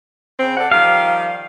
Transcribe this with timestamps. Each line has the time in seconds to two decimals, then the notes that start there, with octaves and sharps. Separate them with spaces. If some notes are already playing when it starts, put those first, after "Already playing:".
0.40 C#3 C4
0.57 A4 D5 F#5
0.71 D#3 F3 G3 F5